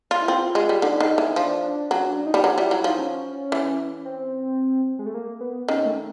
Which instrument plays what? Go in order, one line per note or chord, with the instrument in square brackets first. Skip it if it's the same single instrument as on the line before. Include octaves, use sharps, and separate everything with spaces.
[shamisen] F4
[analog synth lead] E4
[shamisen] C4 [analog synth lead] F4
[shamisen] G#3
G3
[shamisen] D3 [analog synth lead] D#4
[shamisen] D#3
E3
[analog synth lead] D#4
[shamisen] F3 [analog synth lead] D4
[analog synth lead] D4
[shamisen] F#3 [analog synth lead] C#4
[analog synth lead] D4
D#4
[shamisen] G3 [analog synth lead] F#4
[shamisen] F#3 [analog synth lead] F4
[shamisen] G3 [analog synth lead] E4
[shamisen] F#3 [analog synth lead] E4
[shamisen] F3 [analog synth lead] D#4
[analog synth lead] C#4
[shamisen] E3
[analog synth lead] C4
G#3
A3
A#3
B3
[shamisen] D#3 [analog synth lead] C#4
[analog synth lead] A3